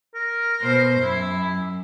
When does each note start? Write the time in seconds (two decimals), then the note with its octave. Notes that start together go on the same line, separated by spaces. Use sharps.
0.15 A#4
0.62 B2 C5
1.01 F#2 E4